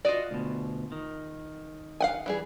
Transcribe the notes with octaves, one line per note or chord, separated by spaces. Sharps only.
F4 F#4 D5 D#5
D2 B2
D#3
F5 F#5 G#5
E3 G3 G#4